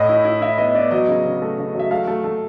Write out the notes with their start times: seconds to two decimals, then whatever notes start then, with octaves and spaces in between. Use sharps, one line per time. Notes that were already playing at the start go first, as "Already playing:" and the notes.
Already playing: A2 D#5
0.09 E4
0.25 E4
0.42 E4 E5
0.58 B3 D#5
0.75 B3 D5
0.91 F#3 D#5
1.08 C#3
1.25 C#3
1.42 A3
1.58 C#3
1.74 F#3 E5
1.91 A3 F5
2.07 A3
2.24 A3